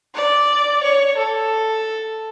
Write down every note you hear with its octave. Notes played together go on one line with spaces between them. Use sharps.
D5
C#5
A4